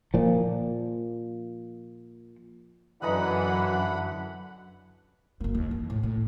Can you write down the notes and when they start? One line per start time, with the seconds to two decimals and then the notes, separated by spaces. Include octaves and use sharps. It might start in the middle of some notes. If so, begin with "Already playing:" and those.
0.14 A#2 F3
3.02 F#2 D3 E3 B4 D#5 F#5 A#5 B5
5.41 F#1 A#3
5.55 D#2
5.71 E3
5.90 A2
6.03 A2